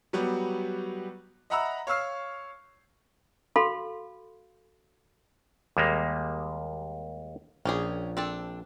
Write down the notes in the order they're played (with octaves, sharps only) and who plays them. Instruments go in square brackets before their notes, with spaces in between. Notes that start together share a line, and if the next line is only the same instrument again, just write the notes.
[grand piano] F#3 G3 B3 F#4
D#5 E5 F#5 A#5 B5 E6
C#5 F5 C#6 E6 F6 C7
[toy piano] F#4 A4 F5 B5 C6
[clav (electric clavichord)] D#2 G3 G#3 A#3
[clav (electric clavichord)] A#1 [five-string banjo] C#4 G4 G#4
[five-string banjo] C4 D4 A4